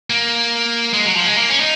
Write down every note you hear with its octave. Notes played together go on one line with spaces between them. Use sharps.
A#3
G#3
F#3
F3
G#3
A#3
C#4
D#4